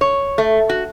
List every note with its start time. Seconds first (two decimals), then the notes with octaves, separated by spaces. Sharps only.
0.01 C#5
0.38 A3
0.69 F#4